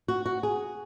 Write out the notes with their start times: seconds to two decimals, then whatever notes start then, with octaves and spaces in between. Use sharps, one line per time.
0.08 F#4
0.26 F#4
0.43 G#4